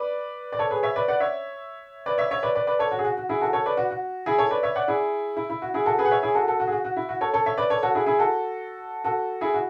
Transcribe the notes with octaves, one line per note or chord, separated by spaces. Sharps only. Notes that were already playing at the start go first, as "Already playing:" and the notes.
Already playing: B4 D5
D5
A4 C#5
G#4 B4
C#5 E5
B4 D5
D5 F#5
C#5 E5
B4 D5
C#5 E5
C#5 E5
B4 D5
B4 D5
B4 D5
A4 C#5
F#4
G#4
F#4
F#4
E4 G#4
F#4 A4
A4 C#5
B4 D5
F#4
F#4
E4 G#4
A4 C#5
B4 D5
C#5 E5
D5 F#5
E4 G#4
E4
E4
F#4
E4 G#4
F#4 A4
G#4 B4
F#5
C#5 E5
E4 G#4
F#4 A4
F#4 A4
F#4
G#4
F#4
F#4
E4
F#4
A4 C#5
A4 C#5
C#5 E5
B4 D5
A4 C#5
F#4 A4
E4 G#4
E4 G#4
F#4 A4
F#4 A4
E4 G#4
F#4